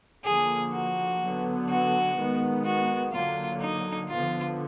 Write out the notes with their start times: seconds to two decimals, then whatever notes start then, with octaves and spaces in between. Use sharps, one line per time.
0.24 D3 F3 A#3 G#4
0.73 F#4
1.21 D3 F#3 B3
1.69 F#4
2.16 D#3 G#3 B3
2.65 F#4
3.13 D3 F#3 A#3 F4
3.61 D#4
4.09 D3 F3 B3 F4